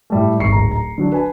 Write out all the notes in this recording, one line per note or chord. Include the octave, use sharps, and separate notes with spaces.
A2 G3 A3
G#1 C#6 C7 C#7
D1 A#5
A#5
D3 F#3 D4
B4 G#5 A5